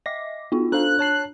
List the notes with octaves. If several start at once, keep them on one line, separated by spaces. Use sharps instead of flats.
D#5 E5 D6 A#6
B3 D#4 F4 F#4
D4 A4 C5 F5 F#6
C#5 A5 C7